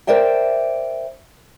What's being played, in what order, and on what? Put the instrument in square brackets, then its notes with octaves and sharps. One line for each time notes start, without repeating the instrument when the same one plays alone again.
[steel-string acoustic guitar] A#4 C5 D5 E5 G5